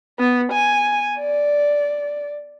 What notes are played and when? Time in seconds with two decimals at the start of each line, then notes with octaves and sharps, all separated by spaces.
0.19 B3
0.52 G#5
1.20 D5